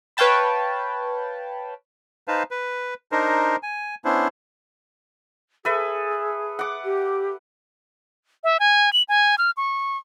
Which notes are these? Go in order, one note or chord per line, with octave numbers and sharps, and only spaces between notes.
B4 C#5 F5 G5 A5 B5
D#4 B4 C5 F5 A5
B4
D4 D#4 A#4 C5
G#5
B3 C#4 D4 E4 C5
G#4 A4 B4 E5
F#5 D6
G4
E5
G#5
F#7
G#5
F6
C#6